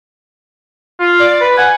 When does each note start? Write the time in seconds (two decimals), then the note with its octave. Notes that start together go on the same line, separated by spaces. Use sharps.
1.00 F4
1.20 D5
1.41 B4
1.57 F#5 G#5